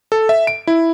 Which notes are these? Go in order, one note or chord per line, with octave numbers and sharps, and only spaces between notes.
A4
E5
D7
E4